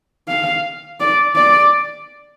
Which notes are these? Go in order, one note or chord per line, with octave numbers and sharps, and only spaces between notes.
F5
D5
D5